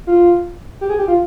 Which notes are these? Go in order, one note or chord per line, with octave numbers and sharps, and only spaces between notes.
F4
G4
G#4
G4
F4